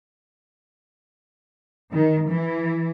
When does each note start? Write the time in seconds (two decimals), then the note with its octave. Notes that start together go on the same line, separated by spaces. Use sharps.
1.91 D#3
2.30 E3